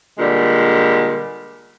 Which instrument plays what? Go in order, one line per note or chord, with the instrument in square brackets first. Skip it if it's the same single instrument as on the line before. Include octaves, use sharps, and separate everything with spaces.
[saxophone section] A#2 D3 G3 G#3